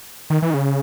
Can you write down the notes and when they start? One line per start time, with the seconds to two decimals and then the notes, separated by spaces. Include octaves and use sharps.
0.30 D#3
0.42 E3
0.50 D#3
0.54 C#3